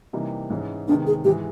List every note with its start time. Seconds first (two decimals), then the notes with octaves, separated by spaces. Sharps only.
0.13 C3 E3 G3 A#3 D#4
0.50 G#2 E3 G#3 C#4
0.88 C3 D#3 G#3 B3 D4
1.07 G#4
1.24 G#2 E3 G#3 G4